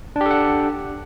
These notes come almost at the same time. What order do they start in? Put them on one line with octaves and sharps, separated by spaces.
D4 G4 A4 F#5